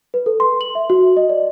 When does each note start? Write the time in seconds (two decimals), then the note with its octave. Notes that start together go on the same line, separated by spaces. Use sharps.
0.14 B4
0.26 A4
0.40 C6
0.61 F#7
0.75 E5
0.90 F#4
1.17 D#5
1.30 D5